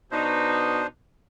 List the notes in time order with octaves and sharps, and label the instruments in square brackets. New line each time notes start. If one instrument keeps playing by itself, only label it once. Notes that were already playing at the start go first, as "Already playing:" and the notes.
[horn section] B2 D#4 [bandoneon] D4 C5